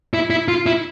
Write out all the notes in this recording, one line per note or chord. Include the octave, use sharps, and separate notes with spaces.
E4
E4
F4
E4